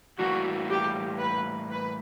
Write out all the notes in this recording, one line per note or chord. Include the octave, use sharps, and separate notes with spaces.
A2 E3 G3 A#3 F#4
G4
B4
B4